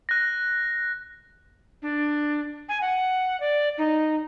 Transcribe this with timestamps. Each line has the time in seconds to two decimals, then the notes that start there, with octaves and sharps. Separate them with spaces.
0.09 F#6 A#6
1.82 D4
2.69 G#5
2.81 F#5
3.40 D5
3.78 D#4